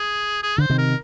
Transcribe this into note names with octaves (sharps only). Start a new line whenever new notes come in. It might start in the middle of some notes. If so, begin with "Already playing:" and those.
Already playing: G#4
G#4
D3 C5
C3 D#3
A#4